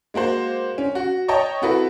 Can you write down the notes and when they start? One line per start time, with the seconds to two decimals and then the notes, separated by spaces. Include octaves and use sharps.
0.14 G#3 A#3 F#4 C5
0.78 C#4
0.95 F#4
1.28 C#5 D#5 G5 A5 A#5 C#6
1.62 C4 E4 F#4 A4 B4